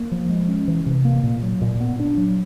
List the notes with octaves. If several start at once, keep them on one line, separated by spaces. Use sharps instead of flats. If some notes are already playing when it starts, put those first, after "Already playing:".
Already playing: A#3
F3
G#3
C#4
E3
C3
A#3
A#2
F#3
A#2
B3
D4
F#3